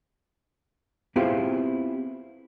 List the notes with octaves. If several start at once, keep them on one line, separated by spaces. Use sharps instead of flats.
B3 C4 E4 F4 G4 G#4